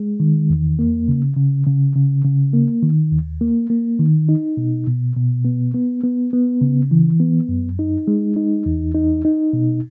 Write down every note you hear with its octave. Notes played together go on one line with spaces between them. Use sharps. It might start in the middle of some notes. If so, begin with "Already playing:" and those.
Already playing: G#3
D#3
E2
A#3
C#3
C#3
C#3
C#3
C#3
A#3
D#3
D#2
A#3
A#3
D#3
D#4
B2
B2
B2
B3
B3
B3
B3
C#3
E3
B3
F#2
D#4
G#3
D#4
E2
D#4
D#4
B2